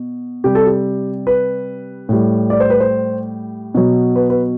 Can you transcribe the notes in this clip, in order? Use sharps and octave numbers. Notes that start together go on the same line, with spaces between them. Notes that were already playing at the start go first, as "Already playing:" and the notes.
Already playing: B2
C3 G3 G4
A4
G4
B4
A2 G3
D5
C5
B4
C5
B2 F#3
B4
B4